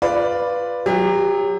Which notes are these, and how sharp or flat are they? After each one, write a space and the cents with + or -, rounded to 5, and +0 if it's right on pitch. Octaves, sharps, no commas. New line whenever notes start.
F4 +0 B4 +0 D5 +0
F#3 +0 G4 +35